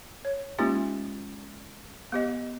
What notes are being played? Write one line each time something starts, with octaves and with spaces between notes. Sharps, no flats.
C#5
G#3 A#3 C#4 D#4 F4 G4
B3 G4 D#5